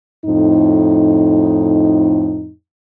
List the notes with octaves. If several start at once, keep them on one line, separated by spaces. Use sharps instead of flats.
F2 A2 D#4